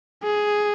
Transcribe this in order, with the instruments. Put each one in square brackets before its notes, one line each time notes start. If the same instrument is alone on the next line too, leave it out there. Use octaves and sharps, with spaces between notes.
[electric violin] G#4